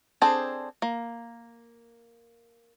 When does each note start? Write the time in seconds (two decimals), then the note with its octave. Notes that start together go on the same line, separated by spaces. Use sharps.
0.22 C4 D4 G#4 A4 C5
0.82 A#3